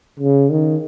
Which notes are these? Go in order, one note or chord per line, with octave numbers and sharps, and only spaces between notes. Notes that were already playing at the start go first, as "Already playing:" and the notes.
C#3
D#3